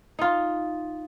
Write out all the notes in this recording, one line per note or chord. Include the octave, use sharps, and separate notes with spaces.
D#4 F4